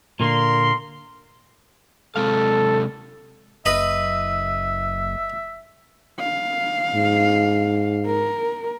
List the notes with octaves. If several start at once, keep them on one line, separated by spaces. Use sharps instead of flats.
A#2 D3 A#3 A#4 C6
C3 G#3 A4 F5
F#1 B4 D#5 E5 B5
F5
G#2
A#4